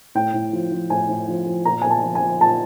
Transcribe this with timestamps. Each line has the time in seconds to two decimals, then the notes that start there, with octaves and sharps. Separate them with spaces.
0.15 A2 G5
0.34 A2
0.53 F3
0.72 F3
0.90 A2 G#5
1.09 A2
1.28 F3
1.47 F3
1.65 A#2 A#5
1.82 A#2 G#5
1.90 A5
2.03 F3
2.15 G#5
2.22 F3
2.40 A#2 A5